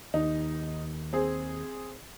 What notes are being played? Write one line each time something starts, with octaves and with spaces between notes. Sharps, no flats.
D#2 D#4
C4 G#4